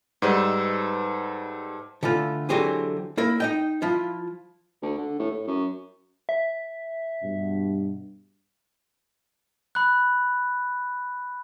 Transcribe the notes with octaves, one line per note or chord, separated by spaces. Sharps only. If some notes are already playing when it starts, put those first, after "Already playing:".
G#2 G3 D#4 A4 B4 C5
D3 E3 A3 F4
D3 E3 F#3 C4 G4 G#4
A#3 E4 A#4
D#4 D#5 G5
F3 E4 F4
D2
D3
A2
A2
F#2
E5
G2 B2
B5 F#6